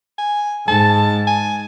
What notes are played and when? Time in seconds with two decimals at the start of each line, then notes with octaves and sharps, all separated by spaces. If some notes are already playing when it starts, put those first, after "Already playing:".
0.18 G#5
0.68 G#2 A5
1.27 G#5